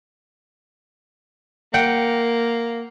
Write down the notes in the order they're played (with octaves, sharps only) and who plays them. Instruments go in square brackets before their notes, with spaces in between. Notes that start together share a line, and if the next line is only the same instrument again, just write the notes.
[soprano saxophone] A#3 [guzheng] F#5 G5